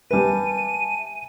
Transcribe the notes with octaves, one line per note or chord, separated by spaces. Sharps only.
G3 B4 E5 G#5 A5 D#7